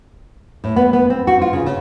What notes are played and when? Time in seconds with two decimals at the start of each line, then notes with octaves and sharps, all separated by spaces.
0.64 A2
0.76 B3
0.93 B3
1.10 C4
1.27 F#4
1.41 F4
1.53 C#3
1.66 C#3